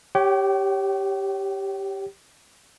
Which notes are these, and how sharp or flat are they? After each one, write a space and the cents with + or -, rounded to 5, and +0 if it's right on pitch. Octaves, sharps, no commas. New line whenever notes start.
G4 +0 C#5 +0 G5 -40